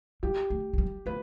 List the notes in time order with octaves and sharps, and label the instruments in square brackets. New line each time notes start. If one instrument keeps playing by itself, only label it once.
[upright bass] G3 [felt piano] G4
[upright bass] A3
A3
G3
[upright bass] A3 [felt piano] B4